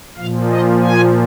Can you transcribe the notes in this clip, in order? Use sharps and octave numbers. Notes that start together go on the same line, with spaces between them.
A#2 F3 F5
D#5
G#5